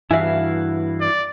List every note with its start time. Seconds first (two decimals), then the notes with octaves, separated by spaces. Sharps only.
0.11 G2 E3 E4 F#4 E5 F5 G#5
1.01 D5